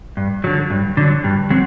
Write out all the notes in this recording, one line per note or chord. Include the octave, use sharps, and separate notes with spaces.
G2
D3 F#3
G2
D3 F#3
G2
F#3 C4